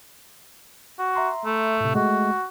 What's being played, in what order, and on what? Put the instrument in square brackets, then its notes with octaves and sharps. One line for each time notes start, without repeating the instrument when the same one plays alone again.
[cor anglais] F#4
[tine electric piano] E5 A#5 C6
[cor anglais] A3
[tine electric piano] A2 C3
[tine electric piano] G#3 A3 [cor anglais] F#4